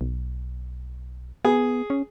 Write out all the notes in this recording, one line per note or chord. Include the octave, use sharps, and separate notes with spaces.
B1
B3 G#4
C#4